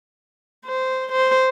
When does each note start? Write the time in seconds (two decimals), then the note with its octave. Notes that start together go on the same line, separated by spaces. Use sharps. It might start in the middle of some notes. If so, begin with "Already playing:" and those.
0.66 C5
1.12 C5